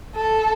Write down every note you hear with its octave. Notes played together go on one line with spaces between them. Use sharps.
A4